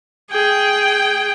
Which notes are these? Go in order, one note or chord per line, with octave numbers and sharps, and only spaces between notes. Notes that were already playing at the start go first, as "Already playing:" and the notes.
G#4 G5